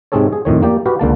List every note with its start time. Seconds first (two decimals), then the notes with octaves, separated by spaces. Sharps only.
0.12 G#2 C3 C4 G#4 A4 C#5
0.33 G#4
0.45 F2 A2 D#3 C#5
0.62 A#3 G4 D5
0.86 F#4 G4 B4 F5
1.00 C#2 D3 A#3 A5